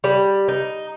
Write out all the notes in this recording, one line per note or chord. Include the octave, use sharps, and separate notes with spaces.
G3
D#4